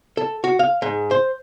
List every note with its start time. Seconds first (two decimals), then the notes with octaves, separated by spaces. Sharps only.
0.17 A4
0.44 F#4
0.59 F5
0.82 G#2
1.11 C5